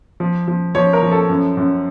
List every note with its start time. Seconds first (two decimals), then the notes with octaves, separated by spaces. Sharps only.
0.20 F3
0.48 F3
0.75 F3 C#5
0.93 A#4
1.03 F3
1.11 A4
1.29 F#2
1.57 F#2